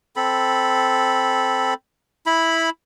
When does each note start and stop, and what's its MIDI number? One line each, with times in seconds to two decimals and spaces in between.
0.16 1.74 60
0.16 1.74 69
0.16 1.74 83
2.26 2.70 64
2.26 2.70 83